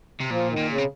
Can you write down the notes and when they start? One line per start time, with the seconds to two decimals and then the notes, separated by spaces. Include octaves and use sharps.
0.20 C3
0.30 A#2 F3
0.49 D#3
0.57 A#2
0.68 C#3
0.78 C3